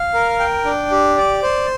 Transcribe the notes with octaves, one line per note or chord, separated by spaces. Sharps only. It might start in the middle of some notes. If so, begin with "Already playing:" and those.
Already playing: F5
A#4
G5
D4
G4
D5
C5